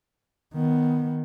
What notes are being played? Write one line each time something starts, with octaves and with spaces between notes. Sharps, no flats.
D#3 B3